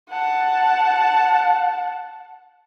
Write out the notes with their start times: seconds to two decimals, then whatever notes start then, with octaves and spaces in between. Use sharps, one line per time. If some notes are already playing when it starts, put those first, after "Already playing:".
0.10 F#5 A5